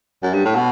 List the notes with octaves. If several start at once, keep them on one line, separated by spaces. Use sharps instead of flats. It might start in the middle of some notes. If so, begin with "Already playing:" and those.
F#2
G2
A2
B2